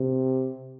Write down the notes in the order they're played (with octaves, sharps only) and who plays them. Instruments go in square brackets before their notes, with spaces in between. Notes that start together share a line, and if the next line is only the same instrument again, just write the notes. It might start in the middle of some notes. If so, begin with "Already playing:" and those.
Already playing: [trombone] C3